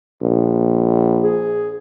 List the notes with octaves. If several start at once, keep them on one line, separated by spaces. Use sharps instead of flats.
A#1
G#4